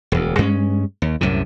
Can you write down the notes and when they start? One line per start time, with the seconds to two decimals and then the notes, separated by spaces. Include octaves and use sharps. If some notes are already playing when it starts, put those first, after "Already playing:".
0.12 E1 D2
0.38 G2 G#3 A3 C#4
1.02 D#2
1.21 C2 F#2 A2 C3